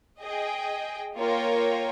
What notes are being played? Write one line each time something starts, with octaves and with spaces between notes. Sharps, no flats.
G#4 D#5 G5
A#3 F4 A#4 C#5 G5